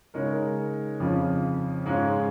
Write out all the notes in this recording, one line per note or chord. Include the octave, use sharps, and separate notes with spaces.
C#3 G#3 D#4 A#4 C#5
F2 C#3 F3 C#4
G#2 G#3 C#4 F4 C#5